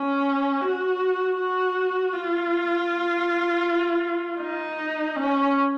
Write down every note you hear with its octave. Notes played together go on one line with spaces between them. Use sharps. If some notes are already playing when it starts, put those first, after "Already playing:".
Already playing: C#4
F#4
F#4
F4
D#4
C#4